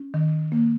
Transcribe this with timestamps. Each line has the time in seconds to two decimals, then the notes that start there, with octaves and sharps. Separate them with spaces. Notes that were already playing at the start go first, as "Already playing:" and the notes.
Already playing: C#4
0.14 D#3
0.52 A#3